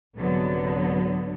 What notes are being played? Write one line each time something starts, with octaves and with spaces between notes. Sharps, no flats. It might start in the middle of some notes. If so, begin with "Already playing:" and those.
C2 G#2 D3 F#3 B3